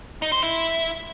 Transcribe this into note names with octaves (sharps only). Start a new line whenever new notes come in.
D#4
C5
E4